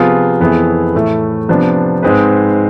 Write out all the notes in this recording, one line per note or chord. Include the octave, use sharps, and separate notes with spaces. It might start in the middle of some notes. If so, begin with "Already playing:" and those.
Already playing: C3 F3 B3 F4 G#4
F2 E3 B3 E4 G#4
A2 E3 A3
C3 F3 B3 D4
G#2 G#3 C4 G#4 B4